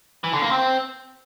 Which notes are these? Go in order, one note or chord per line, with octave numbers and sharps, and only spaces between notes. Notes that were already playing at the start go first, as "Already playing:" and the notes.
E3
D3
A#3
C4